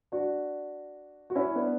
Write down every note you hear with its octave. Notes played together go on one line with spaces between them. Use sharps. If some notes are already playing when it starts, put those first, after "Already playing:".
D4 F#4
F#4
C#4 E4
B3 D4